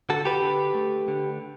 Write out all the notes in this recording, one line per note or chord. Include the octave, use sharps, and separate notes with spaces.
D3 F#4 A4
G4 B4
D3
A3
D3